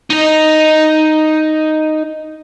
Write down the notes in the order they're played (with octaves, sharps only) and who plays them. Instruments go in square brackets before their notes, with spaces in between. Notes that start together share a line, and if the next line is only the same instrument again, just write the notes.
[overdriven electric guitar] D#4 D#5